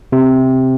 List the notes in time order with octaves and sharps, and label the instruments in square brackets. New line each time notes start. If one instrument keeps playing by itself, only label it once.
[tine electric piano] C3